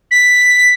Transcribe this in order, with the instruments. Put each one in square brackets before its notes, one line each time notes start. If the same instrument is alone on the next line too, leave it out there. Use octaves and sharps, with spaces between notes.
[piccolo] B6